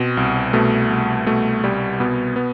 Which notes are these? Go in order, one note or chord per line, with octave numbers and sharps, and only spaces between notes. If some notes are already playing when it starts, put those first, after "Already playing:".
Already playing: B2 C4
C2
B2 A3
C2
B2 A3
C2 G3
B2 B3
B3